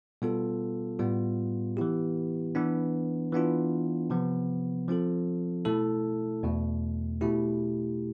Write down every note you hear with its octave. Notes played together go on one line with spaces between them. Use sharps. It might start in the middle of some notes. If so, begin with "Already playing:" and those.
B2 G3 B3 F4 A4
A2 G3 B3 F4
E3 B3 E4 G4
E3 B3 D4
E3 B3 D4 F4
C3 F3 B3
F3 C4 F4 A4
B2 A3 E4 A4
E2 B2 A3
B2 A3 E4 G4